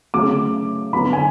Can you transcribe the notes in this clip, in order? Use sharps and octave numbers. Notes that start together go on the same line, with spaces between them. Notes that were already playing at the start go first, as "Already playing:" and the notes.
C#3 F#3 A3 D6
D3 F#3 B3 B5
G#5